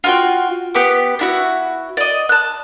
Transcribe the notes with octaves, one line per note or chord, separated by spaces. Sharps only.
F4 F#4 G5
B3 G4 G5 D6
D4 E4 F#4
D5 D#5
A5 F#6